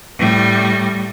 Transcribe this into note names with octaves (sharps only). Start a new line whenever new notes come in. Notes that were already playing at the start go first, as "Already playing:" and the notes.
A2 G3